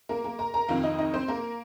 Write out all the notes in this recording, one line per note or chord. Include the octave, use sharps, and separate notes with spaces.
A#3 A#4
A#3 A#4
A#4 A#5
A#4 A#5
F2 D#3 C4 F4 F5
D#4 D#5
D#4 D#5
C4 C5
A#3 A#4